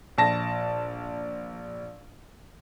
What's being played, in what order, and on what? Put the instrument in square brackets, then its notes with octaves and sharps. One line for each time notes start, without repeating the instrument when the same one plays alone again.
[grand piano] A#1 A5 A#6